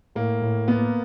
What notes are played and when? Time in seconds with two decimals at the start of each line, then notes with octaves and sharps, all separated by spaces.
0.15 A2 A#3
0.42 A2
0.68 A#3 B3